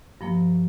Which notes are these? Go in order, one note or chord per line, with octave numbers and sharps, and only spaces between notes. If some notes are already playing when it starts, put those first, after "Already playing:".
G2 F3 A#3